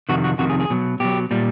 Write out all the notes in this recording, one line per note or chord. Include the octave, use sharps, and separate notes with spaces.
F2 C3 D#3 F#4
F#4
F2 C3 D#3 F#4
G#4
G#4
B2 F#3
B2 F#3 G4
A#2 G3